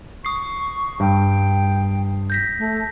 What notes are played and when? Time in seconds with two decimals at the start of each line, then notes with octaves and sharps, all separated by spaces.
0.25 C#6 D#6 C7
1.00 G2 G5
2.30 G6 A#6 B6
2.59 A3